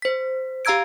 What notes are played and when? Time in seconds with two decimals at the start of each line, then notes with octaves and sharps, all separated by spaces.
0.02 C5 B6
0.65 G4 F5 A#5 E6 G#6 D7